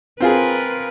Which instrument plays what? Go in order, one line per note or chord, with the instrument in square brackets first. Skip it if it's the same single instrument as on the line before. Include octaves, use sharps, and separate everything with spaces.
[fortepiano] C4 F4 G#4 [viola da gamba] A#4 B4